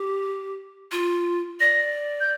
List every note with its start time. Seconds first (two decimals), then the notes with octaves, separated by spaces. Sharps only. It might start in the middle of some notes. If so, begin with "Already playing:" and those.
Already playing: G4
0.92 F4
1.60 D5 A#6
2.20 G6